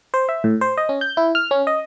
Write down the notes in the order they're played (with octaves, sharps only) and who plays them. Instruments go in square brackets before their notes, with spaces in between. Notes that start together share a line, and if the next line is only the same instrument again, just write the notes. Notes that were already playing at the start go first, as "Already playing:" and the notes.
[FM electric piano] C5
E5
A2
C5
D#5
C#4
G6
E4
F6
C#4
D#5